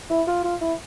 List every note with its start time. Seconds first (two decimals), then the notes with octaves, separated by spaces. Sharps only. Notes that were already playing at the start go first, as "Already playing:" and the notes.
0.10 E4
0.28 F4
0.44 F4
0.61 E4